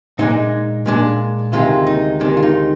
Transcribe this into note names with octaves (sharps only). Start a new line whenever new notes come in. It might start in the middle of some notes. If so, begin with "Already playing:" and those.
A#2 G#3 D4 D#4
A#2 G#3 D4
D2 C3 D#3 G#3 F4
D#4
D2 C3 D#3 G#3 D4
F4
D#4